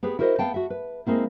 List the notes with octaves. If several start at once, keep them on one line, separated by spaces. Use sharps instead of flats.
B3 G4 G#4 B4
E4 F#4 A#4 C5 D5 D#5
B3 F5 G5 A5
F#4 E5
B4
G#3 A#3 C4 E4